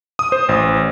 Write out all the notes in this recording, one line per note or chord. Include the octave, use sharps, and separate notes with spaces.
D#6
C5
A1